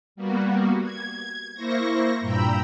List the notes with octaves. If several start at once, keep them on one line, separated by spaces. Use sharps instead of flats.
G3 A#3 B3 F#4
G#6
A#3 E4 C5 C#6 A#6
G2 A#2 G5 A#5 B5 E6